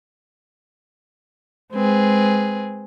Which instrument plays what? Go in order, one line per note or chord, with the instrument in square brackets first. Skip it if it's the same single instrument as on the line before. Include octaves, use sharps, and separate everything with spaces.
[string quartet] G#3 C4 G#4 B4